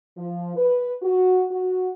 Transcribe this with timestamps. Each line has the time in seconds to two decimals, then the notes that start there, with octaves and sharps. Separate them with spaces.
0.17 F3
0.57 B4
1.02 F#4
1.51 F#4